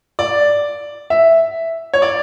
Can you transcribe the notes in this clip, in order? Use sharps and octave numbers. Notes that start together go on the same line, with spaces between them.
D5
E5
C#5
D5